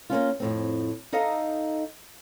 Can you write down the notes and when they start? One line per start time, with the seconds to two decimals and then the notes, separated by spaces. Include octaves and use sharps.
0.10 A#3 C4 C#4 F4
0.40 F2 A2 C4
1.12 D#4 A4 D#5 F5 A#5